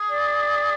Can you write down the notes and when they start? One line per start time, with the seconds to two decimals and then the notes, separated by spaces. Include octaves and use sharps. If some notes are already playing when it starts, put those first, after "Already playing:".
Already playing: G#4
0.10 D5